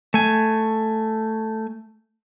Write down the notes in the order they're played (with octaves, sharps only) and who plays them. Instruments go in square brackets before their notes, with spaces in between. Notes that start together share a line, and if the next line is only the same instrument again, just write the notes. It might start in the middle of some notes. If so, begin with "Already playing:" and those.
[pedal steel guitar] A3 G#5